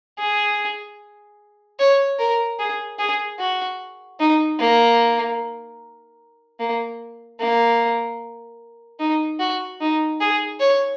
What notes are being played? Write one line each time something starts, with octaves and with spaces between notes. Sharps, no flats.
G#4
C#5
A#4
G#4
G#4
F#4
D#4
A#3
A#3
A#3
D#4
F#4
D#4
G#4
C#5